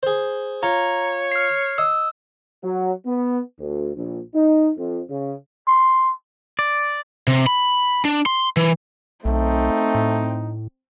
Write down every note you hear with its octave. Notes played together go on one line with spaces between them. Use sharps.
G#4 C5
F4 C#5 A#5
F6 C7
D#5 E6
F#3
B3
D2
A#1
D#4
F2
C#3
C6
D5
C3
B5
D4
C6
E3
B1 A3 C4 D#4
A2